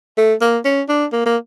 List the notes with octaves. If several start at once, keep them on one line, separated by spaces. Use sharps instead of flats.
A3
A#3
C#4
D4
A#3
A#3